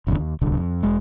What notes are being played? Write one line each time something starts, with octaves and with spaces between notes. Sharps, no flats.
F#1 B1 E2 D3
D#2
D1 C2 D3
F2
E1 G#3